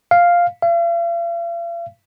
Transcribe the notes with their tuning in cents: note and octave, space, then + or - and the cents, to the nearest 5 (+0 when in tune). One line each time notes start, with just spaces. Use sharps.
F5 +0
F5 -45